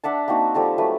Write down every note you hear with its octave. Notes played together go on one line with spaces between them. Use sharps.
D4 E5 F#5 A5
A#3 C4 D#4 F#4
F3 G3 A4 A#5
F#3 A3 B4